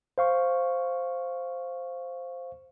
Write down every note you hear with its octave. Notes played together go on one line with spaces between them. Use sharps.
C5 F5 C#6